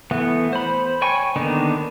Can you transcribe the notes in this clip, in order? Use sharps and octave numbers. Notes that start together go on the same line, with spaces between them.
E3 A3 B3
C5 B5
C#5 G5 G#5 C#6
D3 D#3 A#3 B3 D#4